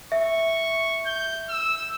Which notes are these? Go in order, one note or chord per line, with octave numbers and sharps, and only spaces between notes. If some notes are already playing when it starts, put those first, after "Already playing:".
E5 C#6
G6
E6